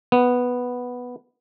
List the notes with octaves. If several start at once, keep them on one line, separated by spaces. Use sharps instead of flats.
B3